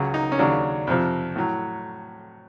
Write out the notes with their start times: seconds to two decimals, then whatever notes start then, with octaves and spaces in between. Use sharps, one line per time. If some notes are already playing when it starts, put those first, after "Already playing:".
Already playing: C#2 C#3 F#3
0.14 D#4
0.32 C#4
0.39 D#2 C#3 F#3 D4
0.87 F2 C3 F3
1.36 A2 F#3